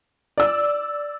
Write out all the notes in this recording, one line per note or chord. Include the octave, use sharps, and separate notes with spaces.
D5 E6